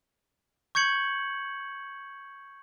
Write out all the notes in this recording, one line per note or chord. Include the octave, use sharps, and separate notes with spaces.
C#6 G6 G#6 C#7 F#7